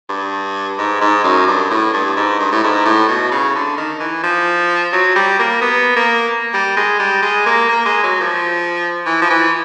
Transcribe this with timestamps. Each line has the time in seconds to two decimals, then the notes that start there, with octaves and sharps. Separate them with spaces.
0.09 G2
0.78 G#2
1.01 G#2
1.24 F#2
1.47 G2
1.70 A2
1.93 G2
2.16 G#2
2.39 G2
2.52 A2
2.63 G#2
2.85 A2
3.08 B2
3.31 C#3
3.55 D3
3.77 D#3
4.00 E3
4.23 F3
4.92 F#3
5.15 G3
5.39 A#3
5.61 B3
5.96 A#3
6.54 G3
6.77 G#3
6.99 G3
7.22 G#3
7.46 A#3
7.69 A#3
7.85 G#3
8.03 F#3
8.20 F3
9.06 E3
9.22 F3
9.30 E3